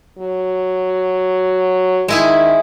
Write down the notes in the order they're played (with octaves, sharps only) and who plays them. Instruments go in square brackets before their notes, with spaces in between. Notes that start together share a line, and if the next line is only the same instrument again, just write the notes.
[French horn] F#3
[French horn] D#3 [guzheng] G#3 E4 G#4